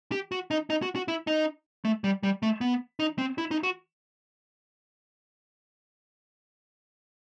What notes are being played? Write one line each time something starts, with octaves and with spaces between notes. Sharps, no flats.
G4
F#4
D#4
D#4
F#4
F#4
E4
D#4
A3
G3
G3
A3
B3
D#4
C4
E4
D#4
F#4